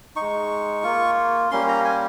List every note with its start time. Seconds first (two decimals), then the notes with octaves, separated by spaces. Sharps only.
0.16 G#3 D#4 C#6
0.84 A#3 F4
1.51 G3 A#3 C#4 C6
1.68 A#5
1.85 G#5